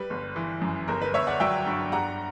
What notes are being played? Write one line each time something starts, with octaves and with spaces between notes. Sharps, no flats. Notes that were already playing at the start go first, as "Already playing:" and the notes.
Already playing: G3 B4
G1
E3
F#2
G1 A#4
B4
G1 C#5 E5
D5 F#5
F#3 E5 G5
G2
G3 F#5 A#5